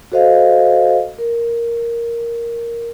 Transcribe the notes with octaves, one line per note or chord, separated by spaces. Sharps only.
F#4 A4 C5 D#5 F5
A#4